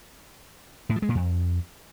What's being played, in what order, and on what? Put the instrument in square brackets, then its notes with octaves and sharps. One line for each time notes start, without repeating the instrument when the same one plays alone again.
[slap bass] A2
F3
G#3
A#2
F2